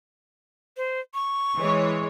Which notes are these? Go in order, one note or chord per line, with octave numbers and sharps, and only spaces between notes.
C5
C#6
E3 G#3 C#5